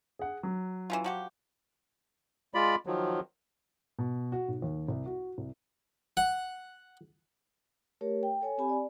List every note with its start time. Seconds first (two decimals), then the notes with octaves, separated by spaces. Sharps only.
0.19 G#4 F#5
0.43 F#3
0.90 E3 C#4 F4
1.04 F3 F#4 G4
2.54 G#3 F4 D5 B5
2.86 D#3 F3 F#3
3.99 B2
4.32 F#4
4.48 B1
4.62 D#2
4.88 C2
5.06 F#4
5.38 C2
6.17 F#5
8.01 A3 G4 A#4 C#5
8.23 G5
8.41 A4 C#5 G#5
8.58 C4 G4 G#5 B5
8.69 D5